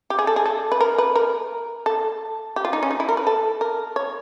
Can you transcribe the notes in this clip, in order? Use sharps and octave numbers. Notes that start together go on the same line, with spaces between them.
G4
G#4
A4
G#4
A4
B4
A#4
B4
A#4
A4
G4
F4
D#4
C#4
D#4
E4
A#4
B4
A4
A#4
C#5